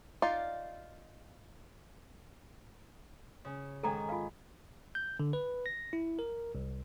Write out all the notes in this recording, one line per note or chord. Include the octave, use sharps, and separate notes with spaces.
D#4 F4 D5 F5
C#3
G#2 D#3 A4 G5 G#5 A#5
F4 F5
G6
D3
B4
A#6
E4
A#4
C2